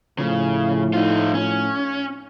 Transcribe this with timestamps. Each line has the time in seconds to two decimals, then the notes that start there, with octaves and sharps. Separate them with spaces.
0.19 A2 C#3 F3
0.93 D#4 F4
1.34 C#4